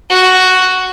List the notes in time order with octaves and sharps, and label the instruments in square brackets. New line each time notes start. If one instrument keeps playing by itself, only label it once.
[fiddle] F#4